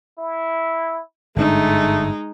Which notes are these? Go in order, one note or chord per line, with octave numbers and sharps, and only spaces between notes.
E4
G1 G#2 G#3 A3 D4 D#4